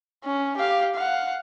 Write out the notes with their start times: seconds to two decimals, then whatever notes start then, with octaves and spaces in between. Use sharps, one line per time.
0.24 C#4
0.57 G4 F5
0.94 F5 F#5